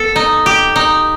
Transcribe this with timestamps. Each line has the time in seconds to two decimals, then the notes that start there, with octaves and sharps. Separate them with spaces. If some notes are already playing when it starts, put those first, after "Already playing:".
Already playing: B3 A4
0.16 D#4
0.46 G4
0.76 D#4